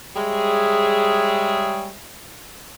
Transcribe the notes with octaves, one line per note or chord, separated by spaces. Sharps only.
G3 G#3 G#4 C#5 E5